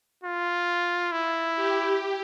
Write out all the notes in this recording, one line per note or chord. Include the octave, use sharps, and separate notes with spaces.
F4
E4
G4